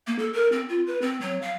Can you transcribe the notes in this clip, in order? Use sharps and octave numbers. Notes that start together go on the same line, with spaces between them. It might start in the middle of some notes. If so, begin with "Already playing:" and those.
A#3
A4
A#4
C4
F4
B4
C4
F#3
F5